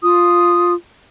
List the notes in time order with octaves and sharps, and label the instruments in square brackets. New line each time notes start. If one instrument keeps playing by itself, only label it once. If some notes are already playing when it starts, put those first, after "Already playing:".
[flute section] F4 D#6